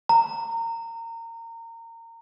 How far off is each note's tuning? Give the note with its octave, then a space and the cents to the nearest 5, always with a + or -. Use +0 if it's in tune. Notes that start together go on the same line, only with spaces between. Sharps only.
A#5 -25